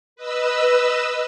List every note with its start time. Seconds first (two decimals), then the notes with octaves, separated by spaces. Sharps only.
0.16 B4 D#5 E6